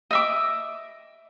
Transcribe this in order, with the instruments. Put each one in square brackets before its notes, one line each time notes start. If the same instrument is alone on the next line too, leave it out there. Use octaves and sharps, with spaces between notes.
[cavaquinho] D#5 E5 D6